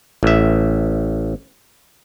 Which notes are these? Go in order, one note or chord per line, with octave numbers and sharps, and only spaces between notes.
A1 E5